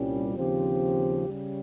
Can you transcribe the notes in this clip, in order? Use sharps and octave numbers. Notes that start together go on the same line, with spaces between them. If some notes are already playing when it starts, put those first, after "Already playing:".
Already playing: C2 A#2 G3 C#4
D#2 C#3 F3 C4 G4
C#3 G3 C#4